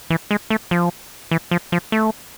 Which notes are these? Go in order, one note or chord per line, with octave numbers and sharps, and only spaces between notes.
E3
G#3
A3
F3
E3
F3
F3
A3